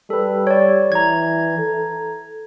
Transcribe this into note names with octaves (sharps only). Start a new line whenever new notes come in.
G3 A4 B4
C#5 D5
E3 A#5 G#6
A4